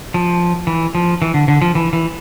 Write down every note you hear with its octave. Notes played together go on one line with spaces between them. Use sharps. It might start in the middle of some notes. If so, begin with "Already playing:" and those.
F3
E3
F3
E3
D3
D3
F3
E3
E3